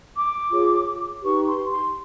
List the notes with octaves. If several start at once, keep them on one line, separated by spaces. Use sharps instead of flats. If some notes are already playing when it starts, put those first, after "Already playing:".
D6
F4 G#4 C#5
D#4 G4 B4 C#6
C6
C6